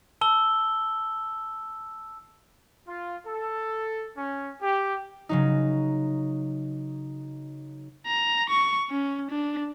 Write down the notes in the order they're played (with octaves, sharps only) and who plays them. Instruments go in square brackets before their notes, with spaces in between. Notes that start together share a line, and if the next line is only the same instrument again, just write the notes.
[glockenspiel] A5 E6 G7
[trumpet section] F4
A4
C#4
G4
[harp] C#3 F#3 D#4
[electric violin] A#5
C#6
C#4
D4